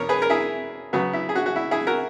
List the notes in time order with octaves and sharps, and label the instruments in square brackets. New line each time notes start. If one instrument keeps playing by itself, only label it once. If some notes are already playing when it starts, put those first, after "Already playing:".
Already playing: [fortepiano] E2 B2 A#4 C#5
G#4 B4
A#4
E4 G#4
C#3 F#3 B3 F#4
E4
G#4
F#4
F#4
E4
E4 G#4
F#4 A#4